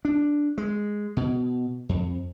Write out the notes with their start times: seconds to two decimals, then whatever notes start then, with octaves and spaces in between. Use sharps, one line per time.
0.05 D4
0.58 G#3
1.17 B2
1.89 F2